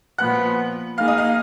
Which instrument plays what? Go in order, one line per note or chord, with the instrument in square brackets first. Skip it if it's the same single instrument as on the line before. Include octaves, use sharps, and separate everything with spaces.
[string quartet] A#2 F3 B3 [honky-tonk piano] F#5 F#6
[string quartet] A#3 D#4 G#4 [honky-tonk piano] F5 F6
[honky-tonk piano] D#5 D#6
F5 F6